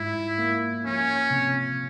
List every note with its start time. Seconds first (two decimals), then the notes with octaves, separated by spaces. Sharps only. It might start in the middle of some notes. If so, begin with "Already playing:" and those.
Already playing: G#2 E4 F4
0.38 A#3
0.84 F3 C#4
1.30 C3